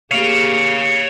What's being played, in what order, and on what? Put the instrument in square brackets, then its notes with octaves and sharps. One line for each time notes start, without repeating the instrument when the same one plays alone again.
[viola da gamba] A#3 G4 G#4 [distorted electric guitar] C#5 F5